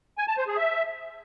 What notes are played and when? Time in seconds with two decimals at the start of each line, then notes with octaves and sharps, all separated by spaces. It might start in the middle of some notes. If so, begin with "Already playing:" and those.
0.18 G#5
0.28 A5
0.38 C5
0.47 G#4
0.57 E5